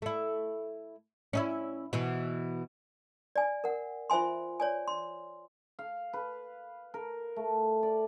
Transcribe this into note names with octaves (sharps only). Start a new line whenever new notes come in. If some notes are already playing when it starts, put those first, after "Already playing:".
A3 E4
C#4 D#4 E4
B2 E3
D5 G#5
A#4 F#5
F4 C5 E5 G#5 C6
C#5 D5 G#5
C6
F5
B4
A#4
A3
D5